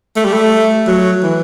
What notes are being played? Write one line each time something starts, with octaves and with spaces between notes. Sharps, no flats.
A3
G3
A3
F#3
E3